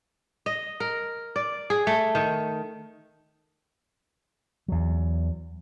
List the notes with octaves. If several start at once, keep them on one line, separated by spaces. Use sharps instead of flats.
D#5
A#4
D5
G#4
A3
D#3
E2 F#3